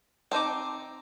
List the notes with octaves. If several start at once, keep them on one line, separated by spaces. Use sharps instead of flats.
C4 D#4 C5 A5 D6